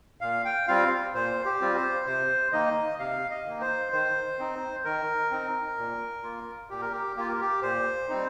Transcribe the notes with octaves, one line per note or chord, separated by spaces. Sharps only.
A#2 F5
G5
G3 C4 F4 F5
A#2 C5
G4
G3 C4 F4
C5
C3 C5
D#3 A#3 D#4 D#5
C3 F5
D#5
D#3 A#3 D#4
C5
D#3 C5
C4 D#4
D#3 A#4
C4 D#4
A#2
A#3 F4
A#2 G4
A#4
G4
A#3 F4 G4
A#4
G4
A#2 C5
G3 C4 D#4